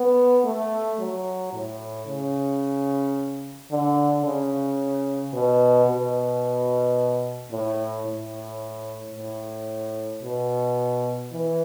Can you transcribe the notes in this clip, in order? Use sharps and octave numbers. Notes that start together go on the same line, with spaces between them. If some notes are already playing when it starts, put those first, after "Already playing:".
Already playing: B3
A3
F#3
A2
C#3
D3
C#3
B2
B2
A2
A2
A2
B2
E3